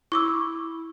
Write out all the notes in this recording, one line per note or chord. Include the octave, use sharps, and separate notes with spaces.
E4 C#6 D6 E6